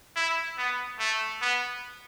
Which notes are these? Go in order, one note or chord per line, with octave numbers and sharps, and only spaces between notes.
E4
B3
A3
B3